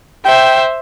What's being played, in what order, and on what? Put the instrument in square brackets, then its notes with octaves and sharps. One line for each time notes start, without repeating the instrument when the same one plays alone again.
[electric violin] C5 E5 [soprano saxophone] G5